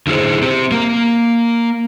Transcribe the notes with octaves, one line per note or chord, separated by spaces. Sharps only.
D3 E4 F4 G#4 C5
C4 G4
A#3 A#4